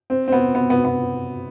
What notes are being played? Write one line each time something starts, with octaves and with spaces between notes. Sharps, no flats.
C4
C4
B3
B3
B3
B3